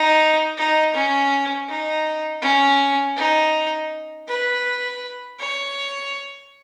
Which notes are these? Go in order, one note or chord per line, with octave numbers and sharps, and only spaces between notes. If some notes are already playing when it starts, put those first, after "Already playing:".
Already playing: D#4
D#4
C#4
D#4
C#4
D#4
B4
C#5